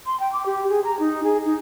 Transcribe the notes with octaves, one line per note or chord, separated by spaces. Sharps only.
C6
G5
D6
G4
G#4
A#5
D#4
G#4
D#4